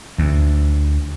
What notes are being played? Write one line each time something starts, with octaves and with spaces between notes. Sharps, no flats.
D2